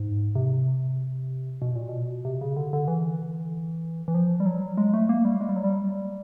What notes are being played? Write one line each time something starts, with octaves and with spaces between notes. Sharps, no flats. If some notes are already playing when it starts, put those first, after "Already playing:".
Already playing: G#2
C3
B2
A#2
B2
C3
C#3
D3
D3
E3
E3
F3
G3
F#3
G#3
A3
A#3
G3
G#3
G3
F#3
G3